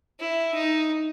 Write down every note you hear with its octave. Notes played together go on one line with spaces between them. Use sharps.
E4
D#4